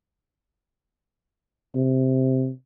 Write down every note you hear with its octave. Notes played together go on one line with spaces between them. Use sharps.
C3